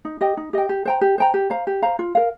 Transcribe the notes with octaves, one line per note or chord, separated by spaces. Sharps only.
D#4
G4 D#5 G5
D#4
G4 D#5 G5
G4
C5 G5 A#5
G4
C5 G5 A#5
G4
C5 F5 A#5
G4
C5 F5 A#5
F4
A#4 F5